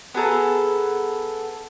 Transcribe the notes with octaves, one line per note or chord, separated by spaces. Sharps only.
B3 G#4 A4 A#5